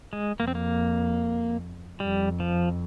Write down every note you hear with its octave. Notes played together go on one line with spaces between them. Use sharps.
G#3
F2 A#3
C4
A#3
F2 G3
F3